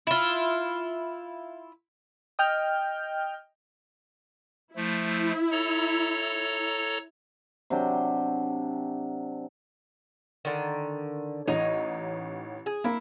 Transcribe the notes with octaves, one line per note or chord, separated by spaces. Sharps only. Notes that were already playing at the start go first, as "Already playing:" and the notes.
E4 F4
D#5 G5 F6 G6
F3 A3 E4
A4 C#5 A#5
C3 F#3 D4 G5
D3 D#3
A1 D#4 C#5
G#4
A#3 E4